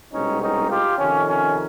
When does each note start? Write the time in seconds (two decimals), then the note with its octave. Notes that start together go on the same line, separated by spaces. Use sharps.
0.12 C2 B2 G#3 C4 C#4 D#4
0.42 C#4 D#4
0.69 F4 G4
0.98 F2 C3 D#3 C#4
1.27 C#4